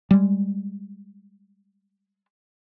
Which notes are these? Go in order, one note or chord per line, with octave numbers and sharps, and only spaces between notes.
G3 G#3